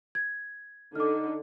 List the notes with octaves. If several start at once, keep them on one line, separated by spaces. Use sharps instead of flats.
G#6
D3 D#4 D6 F6